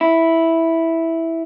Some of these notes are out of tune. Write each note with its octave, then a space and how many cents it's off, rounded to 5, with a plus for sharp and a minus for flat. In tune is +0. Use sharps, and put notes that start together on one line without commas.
E4 -5